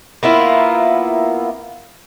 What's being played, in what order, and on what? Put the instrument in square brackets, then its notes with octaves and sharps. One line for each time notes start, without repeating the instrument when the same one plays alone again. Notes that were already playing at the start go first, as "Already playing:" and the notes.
[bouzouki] A#3 B3 E4 F4